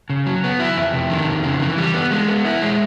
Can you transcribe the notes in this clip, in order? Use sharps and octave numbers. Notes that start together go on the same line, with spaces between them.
C#3
F#3
B3
E4
F2
C3
D#3
F2
C#3
E3
G3
B3
G#3
B3
E4
G#3